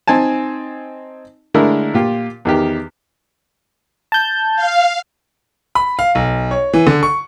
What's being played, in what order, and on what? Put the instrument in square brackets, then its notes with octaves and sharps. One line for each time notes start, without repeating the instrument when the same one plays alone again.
[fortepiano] C4 D#4 G#5 A5
D3 G#3 A3 E4 A#4
A#2 F4 G4
E2 D#3 G4
[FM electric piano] A5 G6
[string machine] F5
[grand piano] B5
F5
B1
C#5
E3
D3
C#6